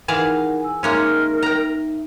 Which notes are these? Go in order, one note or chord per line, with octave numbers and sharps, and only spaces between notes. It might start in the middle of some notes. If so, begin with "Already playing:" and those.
E3 D#4 G#4 A#4 F5 F#5
G#5 E6
G#3 A#3 C#4 D#4 A#4 E5
G5 A#5